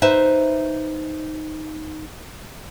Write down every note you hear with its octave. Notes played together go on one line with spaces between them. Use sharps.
D#4 B4 C5 E5